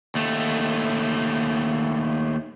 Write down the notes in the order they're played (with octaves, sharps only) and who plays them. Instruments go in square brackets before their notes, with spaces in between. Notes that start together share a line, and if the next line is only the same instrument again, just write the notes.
[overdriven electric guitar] D#2 A3